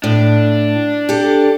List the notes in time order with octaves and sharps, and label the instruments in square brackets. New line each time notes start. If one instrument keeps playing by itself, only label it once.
[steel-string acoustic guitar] A2 [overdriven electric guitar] D4
[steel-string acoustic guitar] G4 A4